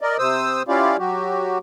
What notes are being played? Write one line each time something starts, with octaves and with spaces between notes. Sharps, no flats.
A#4 D5 D#5
C3 C5 D#6 E6
C#4 E4 F4 G4 D5 F5
F#3 F#4 G4